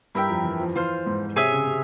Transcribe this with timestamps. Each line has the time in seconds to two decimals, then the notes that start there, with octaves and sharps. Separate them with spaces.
0.15 G2 E4 A#4 E5 G5
0.29 F2
0.44 E3
0.60 F3
0.75 E3 F4 C5 F5
1.06 G#2
1.36 C3 G#4 C#5 E5 G#5
1.52 C#3
1.67 C3